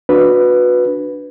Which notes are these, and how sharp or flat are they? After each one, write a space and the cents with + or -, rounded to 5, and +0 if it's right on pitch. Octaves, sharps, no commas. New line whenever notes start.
D4 +0 F#4 -25 B4 +0